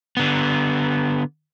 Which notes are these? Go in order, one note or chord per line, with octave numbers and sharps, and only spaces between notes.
D3 B3